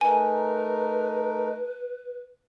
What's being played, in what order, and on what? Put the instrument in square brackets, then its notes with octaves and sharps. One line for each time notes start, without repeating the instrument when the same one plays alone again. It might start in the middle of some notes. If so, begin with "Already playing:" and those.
[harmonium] A3 D#4 A#4 [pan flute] B4 [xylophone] G#5